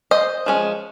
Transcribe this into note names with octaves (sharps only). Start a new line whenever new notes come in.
C5 D#5
F3 G#3 C#4